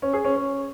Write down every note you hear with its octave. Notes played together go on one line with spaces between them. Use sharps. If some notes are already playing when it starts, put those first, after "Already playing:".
C#4
G#4
C#4
C#4